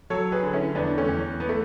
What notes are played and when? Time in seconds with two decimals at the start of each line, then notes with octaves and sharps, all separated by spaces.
0.10 F#3 A4 C#5
0.32 G#4 B4
0.43 D3
0.53 C#4 E4
0.75 E2 B3 D4
0.97 A3 C#4
1.09 E2
1.40 B3
1.49 A3